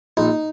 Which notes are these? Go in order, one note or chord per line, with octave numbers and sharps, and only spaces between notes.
A#1 D#4